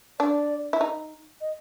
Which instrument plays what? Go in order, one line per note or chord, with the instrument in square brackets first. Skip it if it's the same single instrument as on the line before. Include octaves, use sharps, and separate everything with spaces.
[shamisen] D4 [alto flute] D5
[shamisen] E4
D#4
[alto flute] D#5